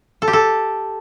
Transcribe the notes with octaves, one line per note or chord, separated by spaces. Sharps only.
A4
G4
A4